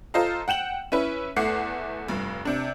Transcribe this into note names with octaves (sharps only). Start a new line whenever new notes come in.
F4 A4 C5 D#5 F5 A#5
F#5 G5 E7 F#7
C#4 E4 B4
E2 A3 F#5 D6 C7
F1 G2
C3 D4